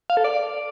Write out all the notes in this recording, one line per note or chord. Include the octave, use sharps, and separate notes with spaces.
F5
A4
D5